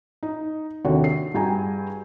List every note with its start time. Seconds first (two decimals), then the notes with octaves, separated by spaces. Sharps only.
0.23 D#4
0.85 D#2 C3 D4 F#4 A4 C#5
1.04 C7
1.34 G2 F#4 G#4 G5 G#5 A#5